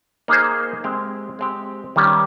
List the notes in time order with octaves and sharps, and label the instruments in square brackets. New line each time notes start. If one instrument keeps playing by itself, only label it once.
[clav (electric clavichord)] A#3 D#4 G#4 C5
G#3 C4 G4
G#3 C4 G4
D#3 G3 C#4